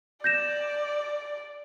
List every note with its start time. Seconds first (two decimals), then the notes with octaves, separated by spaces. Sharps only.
0.24 D5 G6 A#6 E7